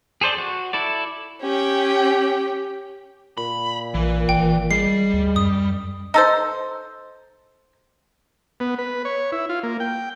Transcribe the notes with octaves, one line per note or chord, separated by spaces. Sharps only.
G#4 A4 C5 D5
F#4
E4 A4 D5
C#4 G4 G5
A#2 B5
A#1 E3
G#1 G5
G3 G#3 C7
D2
F#2 D#6
D#4 A4 C5
B3
B4
C#5
E4
F4
A#3
G5